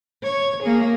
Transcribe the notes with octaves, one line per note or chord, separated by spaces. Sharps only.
C#5
A#3 G#4